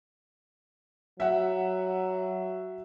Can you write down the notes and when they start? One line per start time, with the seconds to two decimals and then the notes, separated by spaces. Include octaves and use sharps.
1.20 F#3 E5 F#5